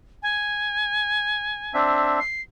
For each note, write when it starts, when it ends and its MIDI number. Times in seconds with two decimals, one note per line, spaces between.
0.23 1.79 80
1.74 2.20 60
1.74 2.20 62
1.74 2.20 76
2.19 2.42 96